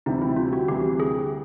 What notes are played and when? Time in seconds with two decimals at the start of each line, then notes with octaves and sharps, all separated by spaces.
0.06 D2 C3 E3 G3 D#4
0.21 E4
0.36 F4
0.53 F#4
0.67 D2 C3 E3 G3 G4
1.00 G#4